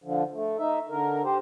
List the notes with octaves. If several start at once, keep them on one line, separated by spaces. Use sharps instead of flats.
D3 F3
A3
D#4 E5
D3 A#4
G4 C5